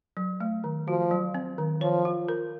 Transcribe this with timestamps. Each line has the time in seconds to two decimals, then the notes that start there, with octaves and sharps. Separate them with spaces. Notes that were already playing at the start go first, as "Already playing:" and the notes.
0.17 F#3
0.40 A3
0.64 D#3
0.87 F3 F#4
1.11 F#3
1.34 C4
1.58 D#3
1.81 F3 C#5
2.05 F4
2.28 A#4